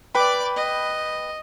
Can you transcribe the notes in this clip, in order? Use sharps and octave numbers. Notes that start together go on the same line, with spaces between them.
B4 D5 G5 B5 D6
D#5